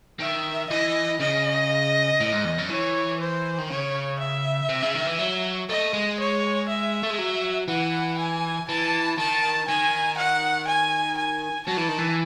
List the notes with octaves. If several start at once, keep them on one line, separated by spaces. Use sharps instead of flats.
D#3 E5
E3 D#5
C#3 D#5
A2
G#2
E2
F#2
E3 C#5
C5
D#3
C#3 C#5
E5
C3
C#3
D#3
E3
F#3
A3 D#5
G#3
C#5
E5
A3
G#3
F#3
E3 F#5
G#5
E3 A5
D#3 A5
D#3 G#5
F#5
G#5
G#5
F#3 A5
E3
D#3
E3